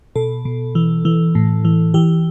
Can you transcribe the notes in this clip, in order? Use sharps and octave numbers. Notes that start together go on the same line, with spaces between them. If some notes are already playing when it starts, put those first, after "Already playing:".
B2 A4
B2
E3
E3
A2
E3
E3 G4